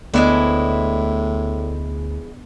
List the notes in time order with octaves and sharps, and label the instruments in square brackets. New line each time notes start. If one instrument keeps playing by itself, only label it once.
[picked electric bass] D2 [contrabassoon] A2 [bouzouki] G#3 E4 C5 [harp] B3 D4